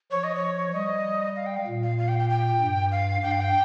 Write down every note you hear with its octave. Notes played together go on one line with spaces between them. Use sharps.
F3 C#5
D#5
C#5
G3 D#5
F5
G5
F5
A#2
F5
F5
G5
G5
G5
G2
F5
G2 G5
F5
G5